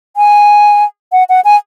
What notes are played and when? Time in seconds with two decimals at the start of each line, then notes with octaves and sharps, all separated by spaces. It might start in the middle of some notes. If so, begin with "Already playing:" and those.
0.17 G#5
1.12 F#5
1.29 F#5
1.44 G#5